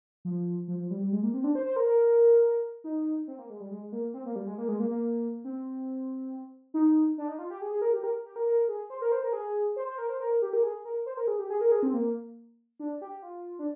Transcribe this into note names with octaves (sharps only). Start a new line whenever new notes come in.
F3
F3
F3
G3
G3
G#3
A#3
C4
D4
C5
C5
A#4
A#4
D#4
C4
A#3
G#3
G3
G#3
A#3
C4
A#3
G3
G#3
A#3
G#3
A#3
A#3
C4
D#4
D4
D#4
F4
G4
G#4
G#4
A#4
G4
A#4
G4
A#4
A#4
G#4
C5
A#4
C5
A#4
G#4
C5
C5
A#4
C5
A#4
G4
A#4
G#4
A#4
C5
A#4
G#4
G4
G#4
A#4
G#4
C4
A#3
D4
G4
F4
D4